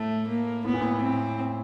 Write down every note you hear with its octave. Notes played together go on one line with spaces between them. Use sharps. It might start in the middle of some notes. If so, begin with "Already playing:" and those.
Already playing: A2 A3
A#3
A2 B3
A#2
A2
C4